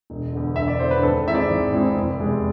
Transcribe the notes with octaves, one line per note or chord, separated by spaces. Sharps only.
E1
E2 D3
E1 E5
D5
E2 D3 C5
B4
G#1 A4
G#2 G#3 C4 E4 E5
D5
G#1
G#2 G#3 C4 E4
F1
E2 C3 G#3